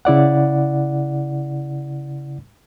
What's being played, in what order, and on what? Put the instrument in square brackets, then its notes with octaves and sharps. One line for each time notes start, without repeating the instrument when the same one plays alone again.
[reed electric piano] C#3 E4 D5 F#5